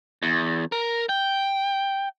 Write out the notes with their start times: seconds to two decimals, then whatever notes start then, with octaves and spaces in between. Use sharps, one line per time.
0.23 E2
0.72 A#4
1.09 G5